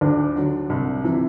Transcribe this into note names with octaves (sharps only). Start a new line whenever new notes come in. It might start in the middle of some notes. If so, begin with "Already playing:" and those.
D2 D4
D3 F#3
C2
C3 E3